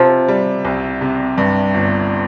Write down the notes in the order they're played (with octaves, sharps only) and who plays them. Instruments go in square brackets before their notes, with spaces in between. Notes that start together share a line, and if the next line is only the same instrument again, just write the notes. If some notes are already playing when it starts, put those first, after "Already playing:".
Already playing: [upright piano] C3 [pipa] F3
[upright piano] G3
C2
C3
G2
G1